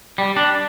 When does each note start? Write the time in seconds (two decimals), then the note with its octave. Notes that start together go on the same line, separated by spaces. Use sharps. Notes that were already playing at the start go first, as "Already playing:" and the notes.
0.18 G3
0.36 D4